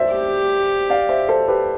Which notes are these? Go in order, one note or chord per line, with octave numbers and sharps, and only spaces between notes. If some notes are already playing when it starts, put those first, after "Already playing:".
Already playing: C5 D5 E5
G4
D5 F5
C5 E5
A4 C5
G4 B4